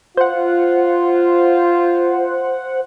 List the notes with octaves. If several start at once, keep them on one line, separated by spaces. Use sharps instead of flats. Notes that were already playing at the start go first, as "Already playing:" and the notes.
F4 C5 F#5